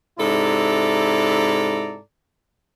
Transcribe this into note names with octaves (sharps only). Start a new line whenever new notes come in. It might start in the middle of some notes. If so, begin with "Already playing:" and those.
G#2 C3 E4 A4 D5 A#5